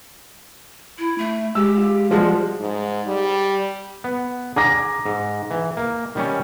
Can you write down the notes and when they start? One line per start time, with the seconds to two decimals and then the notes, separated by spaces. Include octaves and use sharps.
0.98 E4
1.18 A3
1.55 G#3 G4 E6
1.75 F4 F5
2.11 F3 G3 G#3 F#4
2.60 G#2
3.07 G3
4.04 B3
4.56 G#4 A#5 D6 A#6
5.06 G#2
5.51 E3
5.77 A#3
6.15 D#3 G3 C#4